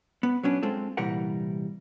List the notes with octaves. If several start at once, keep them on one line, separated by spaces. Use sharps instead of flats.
B3
F#3 B3 C#4 D4
G#3 C4 F4 A4
C2 A#2 E3 G3 A#4 F#5